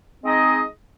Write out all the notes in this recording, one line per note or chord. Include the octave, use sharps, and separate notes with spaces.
G#3 C4 D#4 G#4 D#5